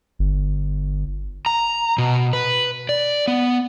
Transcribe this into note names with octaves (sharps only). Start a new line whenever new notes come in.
G1
A#5
B2
B4
D5
B3